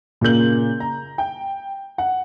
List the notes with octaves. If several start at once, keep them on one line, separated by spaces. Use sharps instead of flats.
A#2 C#3 A#3 G6 F#7
A#5
G5
F#5